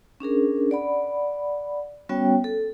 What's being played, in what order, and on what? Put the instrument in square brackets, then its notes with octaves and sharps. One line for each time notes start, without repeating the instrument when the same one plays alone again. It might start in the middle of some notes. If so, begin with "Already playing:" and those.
[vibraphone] C#4 D4 G#4 A#4
D5 F#5 B5
G3 B3 C#4 F#4 C#5 G5
A4